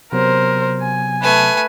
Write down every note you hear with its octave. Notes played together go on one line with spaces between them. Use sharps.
C3 F#3 B3 A#4 C5
G#5
A3 B4 G#5